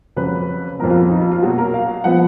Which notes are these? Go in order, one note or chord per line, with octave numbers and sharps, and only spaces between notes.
F2 C#3 F#3 B4
F2 F3 B3 A#4
F4
D#4
F4
F4
B2 F#3 A#3 F#4
A#4
F5
F3 B3 F#5